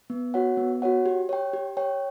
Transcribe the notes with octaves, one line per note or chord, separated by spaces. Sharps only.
B3
F#4 C#5 F#5
B3
F#4 C#5 F#5
G4
C#5 G5
G4
C#5 G5